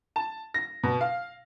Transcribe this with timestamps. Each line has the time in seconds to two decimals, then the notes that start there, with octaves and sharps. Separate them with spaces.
0.16 A5
0.54 A#6
0.83 B2
1.01 F5